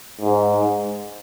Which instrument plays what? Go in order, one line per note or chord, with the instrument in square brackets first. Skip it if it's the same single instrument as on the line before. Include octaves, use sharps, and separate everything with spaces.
[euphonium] G#2